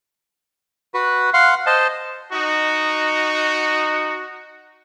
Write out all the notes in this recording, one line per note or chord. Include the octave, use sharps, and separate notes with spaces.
F#4 B4
F5 F#5 C6
C5 D#5 A5
D#4 F#4